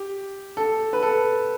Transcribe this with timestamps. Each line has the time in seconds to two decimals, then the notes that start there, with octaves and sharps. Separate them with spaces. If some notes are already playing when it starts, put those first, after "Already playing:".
Already playing: G4
0.57 A4
0.93 B4
1.03 A4